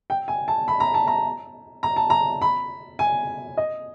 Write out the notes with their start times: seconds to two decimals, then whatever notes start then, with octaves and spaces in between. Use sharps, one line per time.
0.10 G5
0.28 G#5
0.48 A5
0.68 B5
0.80 A#5
0.94 A5
1.07 A#5
1.83 A#5
1.96 A5
2.10 A#5
2.42 B5
2.99 G#5
3.57 D#5